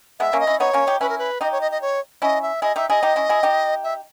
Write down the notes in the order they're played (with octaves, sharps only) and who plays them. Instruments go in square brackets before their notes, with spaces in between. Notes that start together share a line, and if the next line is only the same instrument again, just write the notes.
[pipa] G#3 B3 [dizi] E5
[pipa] A#3 C#4
[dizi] D#5
[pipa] C#4 E4
[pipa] B3 D#4 [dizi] C#5
[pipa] A#3 C#4
D#4 G4
[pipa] C#4 E4 [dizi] B4
[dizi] A#4
B4
[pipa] D#4 G4 [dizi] D#5
[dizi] C#5
D#5
D#5
C#5
[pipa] C#4 E4 [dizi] D#5
[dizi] E5
[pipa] E4 G#4 [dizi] D#5
[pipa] D#4 G4 [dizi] E5
[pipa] E4 G#4 [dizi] D#5
[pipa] D#4 G4
C#4 E4
E4 G#4
D#4 G4
[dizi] E5